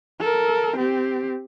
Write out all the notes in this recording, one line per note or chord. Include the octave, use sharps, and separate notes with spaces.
A4 A#4
C4 G4